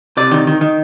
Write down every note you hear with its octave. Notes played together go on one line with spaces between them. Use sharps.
C3 D5
D#3
D#3
D#3